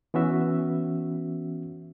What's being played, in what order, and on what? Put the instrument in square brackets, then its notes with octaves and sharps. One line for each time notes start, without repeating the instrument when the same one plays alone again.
[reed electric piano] E3 B3 C#4 F#4 E5